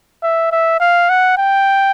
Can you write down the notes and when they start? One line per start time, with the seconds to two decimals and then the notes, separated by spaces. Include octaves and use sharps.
0.23 E5
0.52 E5
0.80 F5
1.09 F#5
1.38 G5